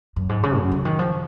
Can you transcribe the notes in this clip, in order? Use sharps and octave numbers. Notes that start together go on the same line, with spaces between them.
F#2
G#2
C#3
F#2
C#3
D#3
F3